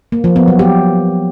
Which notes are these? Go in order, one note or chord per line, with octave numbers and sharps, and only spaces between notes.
A#3
F3
B3
F#3
G4